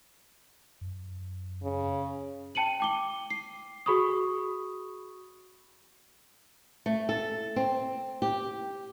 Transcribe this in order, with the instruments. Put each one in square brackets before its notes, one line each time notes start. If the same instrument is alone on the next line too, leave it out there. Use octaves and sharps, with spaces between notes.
[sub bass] F#2
[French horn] C#3
[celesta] G5 A5 C#7 D#7 F#7
G5 D6 G7
C7
F#4 G#4 B5 C#6 D#6
[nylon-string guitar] A3
A4
C4
G4